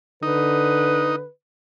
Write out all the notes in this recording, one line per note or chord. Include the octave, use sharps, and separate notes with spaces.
D3 D#4 B4